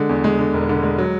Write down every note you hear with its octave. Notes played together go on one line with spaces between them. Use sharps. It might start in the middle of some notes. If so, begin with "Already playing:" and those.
Already playing: D3 G#3
E2
G#3
D3
E1
D3
G#3
F#3